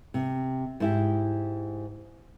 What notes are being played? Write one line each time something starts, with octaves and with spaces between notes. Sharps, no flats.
C3
G#2 E4 G4